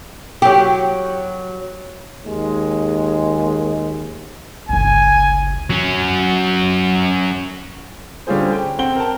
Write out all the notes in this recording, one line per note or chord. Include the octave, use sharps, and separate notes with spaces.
F#3 G4
D#2 G#3
G1 C#2 G#5
F#3 C#4
D3 G3 C#4 F4 G#4 C5
G5
C4 F#5 G5 G7
A#4 A5